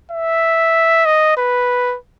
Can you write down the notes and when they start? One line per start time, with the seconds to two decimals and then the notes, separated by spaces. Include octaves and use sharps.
0.12 E5
1.06 D#5
1.37 B4